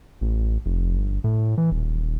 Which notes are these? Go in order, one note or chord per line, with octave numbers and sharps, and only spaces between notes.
A1
F1
G1
A2
E3
D#1